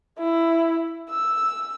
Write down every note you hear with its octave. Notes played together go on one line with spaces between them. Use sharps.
E4
E6